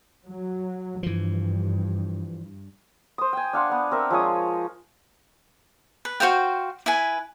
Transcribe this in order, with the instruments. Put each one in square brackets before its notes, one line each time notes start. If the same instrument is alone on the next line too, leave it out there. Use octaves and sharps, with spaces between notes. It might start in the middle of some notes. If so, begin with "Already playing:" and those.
[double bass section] F#3
[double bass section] G2 [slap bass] E3 F3
[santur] C5 D#6
G5 G#5
D4 F5 F#5 C6
B3 D5
C4 A#4 E5
F3 G#3 C#5 D#6
[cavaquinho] B4
F#4 C5 F5 G5
E4 B4 G#5